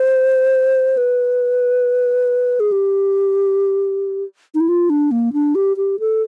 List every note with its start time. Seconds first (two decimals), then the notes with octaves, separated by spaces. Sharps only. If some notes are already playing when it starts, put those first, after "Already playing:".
Already playing: C5
0.97 B4
2.60 G#4
2.72 G4
4.54 D#4
4.60 E4
4.68 F4
4.90 D4
5.11 A#3
5.33 D4
5.55 G4
5.77 G4
5.99 A4